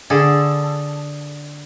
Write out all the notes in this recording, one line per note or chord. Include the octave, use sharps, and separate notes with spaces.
D3 G#4 A4